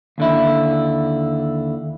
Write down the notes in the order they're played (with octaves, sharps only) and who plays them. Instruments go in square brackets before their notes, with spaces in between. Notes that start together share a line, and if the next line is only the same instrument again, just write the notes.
[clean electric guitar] D#2 D3 E4